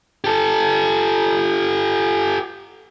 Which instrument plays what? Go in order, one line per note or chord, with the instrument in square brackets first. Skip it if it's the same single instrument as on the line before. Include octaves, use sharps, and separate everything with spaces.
[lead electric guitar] G4 A4